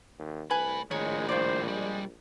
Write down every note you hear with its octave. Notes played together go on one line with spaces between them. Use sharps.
D#2
C2 A2 B4 G#5 B5
A#1 A2 D#3 G#3 C#5
G2 C5 D5
B1 G3 G#3